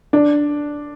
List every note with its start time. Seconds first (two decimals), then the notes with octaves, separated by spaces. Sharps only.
0.13 D4